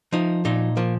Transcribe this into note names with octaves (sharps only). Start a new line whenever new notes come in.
F3 D#4
A#2 D#4
F3 A#3